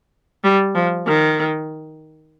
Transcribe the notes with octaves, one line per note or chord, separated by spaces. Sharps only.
G3
F3
D#3